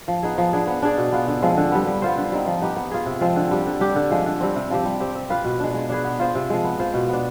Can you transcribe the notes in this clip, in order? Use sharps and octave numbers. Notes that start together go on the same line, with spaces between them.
F3
B3 D#4 G#4
F3
B3 D4 G#4
B3
D4 G#4 D5
B2
B3 F4
D3
F3 G#3 C4
D3
G3 B3
G3
B3 F4 C5
D3
G3 C4 D#4
F3
B3 D#4 G4
B3
F4 G#4
C3
F3 G#3 C4
D3
G3 D4 G4
D3
G3 D4 G4
D3
F3 G#3
D3
G3 C4
C3
F3 C4 G4
G3
C4 G4
C4
F4 B4 F5
B2
G#3 D4
G#3
D4 G#4 B4
B3
F4 C5
C3
F3 G#3
B3
F4 C5 F5
B2
B3 D4